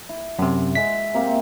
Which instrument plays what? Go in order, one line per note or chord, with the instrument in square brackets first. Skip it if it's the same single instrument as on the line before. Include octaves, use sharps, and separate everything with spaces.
[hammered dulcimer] E4
[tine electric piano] F#2 C3
[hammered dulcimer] G#3 E5 F#5 [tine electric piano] B6
[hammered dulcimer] C3 A#3 C4